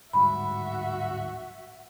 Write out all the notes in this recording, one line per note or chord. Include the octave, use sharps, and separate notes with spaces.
D1 G#2 G3 F#4 E5 B5